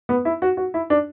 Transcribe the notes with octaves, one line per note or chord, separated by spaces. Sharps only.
B3
E4
F#4
F#4
E4
D4